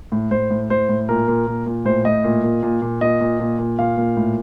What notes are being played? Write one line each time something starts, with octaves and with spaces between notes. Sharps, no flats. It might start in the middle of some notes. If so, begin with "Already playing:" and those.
A2
A2 C5
A2
A2 C5
A2
A#2 A#4
A#2
A#2
A#2
A2 C5
A2 D#5
A#2
A#2
A#2
A#2
A#2 D#5
A#2
A#2
A#2
A#2 F5
A#2
A2